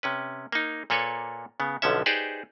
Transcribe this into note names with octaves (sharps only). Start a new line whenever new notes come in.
C3 C#4 B4
A#3 D#4
A#2 A#3 A4 B4 C#5
C#3 B3
B1 D3 F3 C#4 E5
D#4 G4 G#4 B4 C5 D5